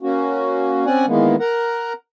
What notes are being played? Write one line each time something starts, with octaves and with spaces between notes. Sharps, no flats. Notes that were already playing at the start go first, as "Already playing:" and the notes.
A#3 C#4 F#4
C4 C#4 D5 F#5 G#5
D#3 E3 G#3 A#3 B3
A#4 F#5 A#5